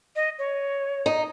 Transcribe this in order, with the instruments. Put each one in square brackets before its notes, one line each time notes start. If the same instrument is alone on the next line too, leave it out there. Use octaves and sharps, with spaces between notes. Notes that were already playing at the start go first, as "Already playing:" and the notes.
[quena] D#5
C#5
[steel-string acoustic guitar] D#4